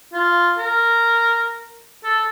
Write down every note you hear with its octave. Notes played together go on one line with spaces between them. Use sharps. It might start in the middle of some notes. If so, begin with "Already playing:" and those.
F4
A#4
A4